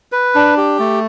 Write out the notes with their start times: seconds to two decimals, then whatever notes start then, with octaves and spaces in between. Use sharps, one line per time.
0.12 B4
0.35 D4
0.57 G4
0.79 A3